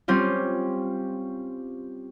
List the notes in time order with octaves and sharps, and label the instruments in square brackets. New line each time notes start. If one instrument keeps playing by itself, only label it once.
[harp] G3 C4 C#4 F4